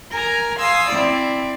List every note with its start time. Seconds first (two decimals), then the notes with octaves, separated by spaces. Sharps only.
0.12 A#4 G#5 A#5
0.58 F5 G#5 C6 D#6 E6
0.90 C4 E4 D5